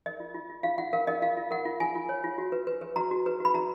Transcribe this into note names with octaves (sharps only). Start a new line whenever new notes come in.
A#4 D#5
F4
F4
F4
F4 F5
F4 F#5
A#4 F5
A#4 D#5
F4 F5
F4
A#4 F#5
F4
F4 G#5
F4
C#5
F4
F#4
B4
B4
B4
F#4 A#5
F#4
B4
F#4 B5
F#4 A#5